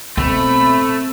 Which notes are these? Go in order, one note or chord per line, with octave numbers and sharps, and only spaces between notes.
B2 A3 C4 B5